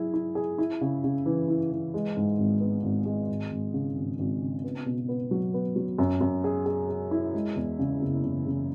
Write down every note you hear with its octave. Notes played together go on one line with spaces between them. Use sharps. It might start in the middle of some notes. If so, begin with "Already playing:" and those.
Already playing: F#3 E4 G#4
E4
G#4
E4
C#3
C#3
E3
E4
E3
G#3
G#2
G#1
B3
G#1
G#3
G#1
G#1
C#3
G#1
G#1
C#3
B3
B2
B3
F#3
B3
F#3
F#2
F#2
G#4
G#4
G#4
E4
G#3
E2
C#3
F#1
F#1
C#3